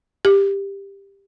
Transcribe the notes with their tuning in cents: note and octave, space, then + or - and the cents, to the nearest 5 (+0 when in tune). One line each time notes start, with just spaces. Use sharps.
G4 +15